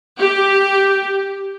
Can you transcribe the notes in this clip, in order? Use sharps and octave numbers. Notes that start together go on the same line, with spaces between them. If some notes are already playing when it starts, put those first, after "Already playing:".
G4